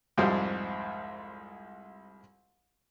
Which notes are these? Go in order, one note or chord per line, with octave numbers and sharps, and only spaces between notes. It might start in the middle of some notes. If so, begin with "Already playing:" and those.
C2 F2 G#2 G3 G#3